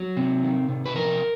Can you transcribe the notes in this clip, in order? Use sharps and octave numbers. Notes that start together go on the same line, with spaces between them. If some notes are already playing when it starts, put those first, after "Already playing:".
Already playing: F#3
C3
D#3
C3
B4
F3 A#4